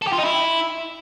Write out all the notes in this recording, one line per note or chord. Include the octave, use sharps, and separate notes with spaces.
A4
G4
F4
D#4
E4